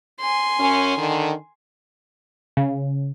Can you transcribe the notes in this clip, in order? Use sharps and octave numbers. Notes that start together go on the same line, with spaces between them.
G#5 C6
F#2 C#4
D3 D#3
C#3